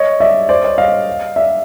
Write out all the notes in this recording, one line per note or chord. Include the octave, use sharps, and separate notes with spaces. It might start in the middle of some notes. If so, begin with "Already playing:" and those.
Already playing: C#5 D#5
D5 E5
C5 D5
C#5 D#5
D#5 F5
D5 E5